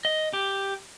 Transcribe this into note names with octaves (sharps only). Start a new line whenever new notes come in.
D#5
G4